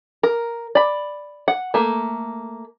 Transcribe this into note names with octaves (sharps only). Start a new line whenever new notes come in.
A#4
D5 B5
F#5
A3 A#3